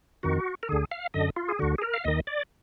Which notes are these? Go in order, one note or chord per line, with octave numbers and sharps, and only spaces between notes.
F2 D#3 F#4
A#4
D2 D3 G#4
F5
F#2 D3 D#5
F4
G#4
D2 D3 F#4
G#4
A#4
F5
D#2 D#3 D#5
D5